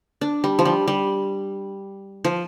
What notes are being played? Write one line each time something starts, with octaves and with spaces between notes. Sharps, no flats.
D4
G3
F3
G3
G3
F3